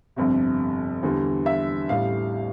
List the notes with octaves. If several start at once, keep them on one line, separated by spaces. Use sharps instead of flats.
G1 F2 C3
E2 D3 G3
E5
A1 A2 G3 F5